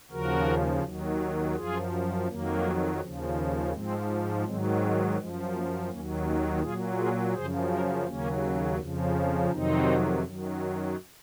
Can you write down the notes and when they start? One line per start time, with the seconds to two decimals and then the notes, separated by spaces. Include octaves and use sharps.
0.11 D#2 C#3 F3 F#4 A#4
0.83 D#2 D#3 F#3
1.56 F#2 F3 F4 G#4
2.28 F2 D#3 F#3 A#3
3.00 D#2 C#3 F3
3.73 G#2 F3 G#3 C4
4.45 G#2 D#3 F#3 G#3 C4
4.81 G#3 C4
5.17 F#2 F3 G#3
5.53 A#3
5.89 D#2 D#3 F#3 A#3 C#4
6.26 A#3 C#4
6.62 A#2 F#3 F4 G#4
6.98 F4 G#4
7.35 F#2 C#3 F3 G#4 C5
7.70 F#4 A#4
8.07 D#2 C#3 F#3 A#3 C#4
8.79 F2 C#3 F3
9.15 C#4 F4
9.52 F2 C3 D#3 F#3 C4 D#4
10.24 F#2 D#3 F#3